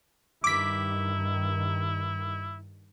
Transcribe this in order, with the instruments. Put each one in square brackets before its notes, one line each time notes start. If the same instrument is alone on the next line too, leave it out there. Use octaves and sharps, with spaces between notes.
[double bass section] G2 D#3 [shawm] E4 [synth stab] D6 B6